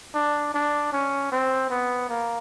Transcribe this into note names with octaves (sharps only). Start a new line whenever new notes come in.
D4
D4
C#4
C4
B3
A#3